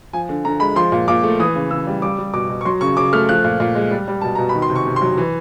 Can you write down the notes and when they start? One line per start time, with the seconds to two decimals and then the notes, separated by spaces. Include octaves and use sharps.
0.13 F3 G#5
0.29 D3
0.45 D3 A#5
0.60 G#3 B5
0.76 F3 C6
0.92 A#2
1.08 A#2 D6
1.24 A3
1.39 E3 D#6
1.55 C#3
1.71 C#3 E6
1.87 G3
2.02 G3 D6
2.18 G3
2.33 B2 D6
2.50 B2
2.61 C#6
2.65 F#3 C6
2.81 C#3 C#6
2.97 C#3 D6
3.13 A3 F6
3.29 F3 F#6
3.44 A#2
3.60 A#2
3.75 G#3
3.91 G3
4.08 G3
4.21 B2 A5
4.35 B2 A#5
4.49 B5
4.55 D#3
4.62 C6
4.70 C3
4.76 C#6
4.86 C3
4.96 C6
5.02 F#3
5.18 E3